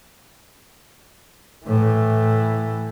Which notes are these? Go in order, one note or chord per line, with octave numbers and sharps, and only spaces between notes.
A2 E3